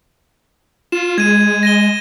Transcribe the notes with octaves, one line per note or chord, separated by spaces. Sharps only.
F4 E7
G#3 G#6 D#7
A#6 D#7 G7